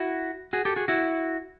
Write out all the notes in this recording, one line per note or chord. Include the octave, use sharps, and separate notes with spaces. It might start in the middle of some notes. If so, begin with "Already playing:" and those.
Already playing: E4 F#4
F#4 G#4
G4 A4
F#4 G#4
E4 F#4